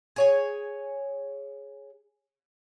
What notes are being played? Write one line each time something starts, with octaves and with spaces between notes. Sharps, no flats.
G#4 C#5 G#5